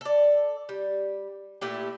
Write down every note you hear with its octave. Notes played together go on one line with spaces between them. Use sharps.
A4 D5
G3
A#2 A3 E4 G4